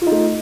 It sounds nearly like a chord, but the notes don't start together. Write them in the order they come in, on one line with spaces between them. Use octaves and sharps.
F4 D#4 A3